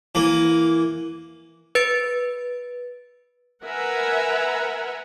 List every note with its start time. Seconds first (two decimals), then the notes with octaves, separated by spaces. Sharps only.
0.15 E3 A#3
1.75 B4 A6 D7
3.64 A#4 B4 E5 F#5 G#5 A#5